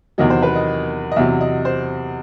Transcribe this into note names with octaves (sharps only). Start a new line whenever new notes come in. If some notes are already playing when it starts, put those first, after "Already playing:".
E2 C3 D#3 F#3 D#5
C5
B4
D#5
D#5
E2 C3 F#3 E5
D#5
C5